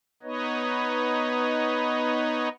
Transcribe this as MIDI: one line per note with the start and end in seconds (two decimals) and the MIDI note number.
0.23 2.49 59
0.23 2.49 63
0.23 2.49 71
0.23 2.49 73
0.23 2.49 75